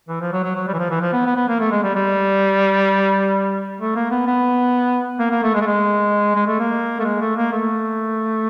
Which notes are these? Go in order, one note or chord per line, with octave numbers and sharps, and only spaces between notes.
E3
F3
F#3
F#3
F#3
G3
E3
F3
E3
F3
B3
B3
B3
A#3
A3
G#3
G3
G3
A3
A#3
B3
B3
A#3
A#3
A3
G#3
A3
G#3
G#3
A3
A#3
A3
G#3
A3
A#3
A3